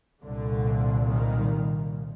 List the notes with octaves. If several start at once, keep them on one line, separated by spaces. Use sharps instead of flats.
C2 A#2 D3
D#3